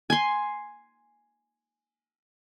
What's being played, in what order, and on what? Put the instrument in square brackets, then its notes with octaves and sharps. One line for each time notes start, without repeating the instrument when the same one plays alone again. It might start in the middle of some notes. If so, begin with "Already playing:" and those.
[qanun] G#5 C6